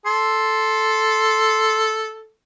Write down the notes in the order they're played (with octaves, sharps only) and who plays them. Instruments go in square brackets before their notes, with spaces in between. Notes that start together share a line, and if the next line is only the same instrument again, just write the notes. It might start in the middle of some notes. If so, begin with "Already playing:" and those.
[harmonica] A4 [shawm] C6